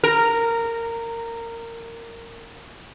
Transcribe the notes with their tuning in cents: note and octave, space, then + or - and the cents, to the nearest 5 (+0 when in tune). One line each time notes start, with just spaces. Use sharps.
A#4 -15